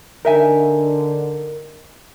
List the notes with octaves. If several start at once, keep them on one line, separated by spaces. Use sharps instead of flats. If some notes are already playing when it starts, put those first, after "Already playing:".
D3 D#4 A#4 E5 G#5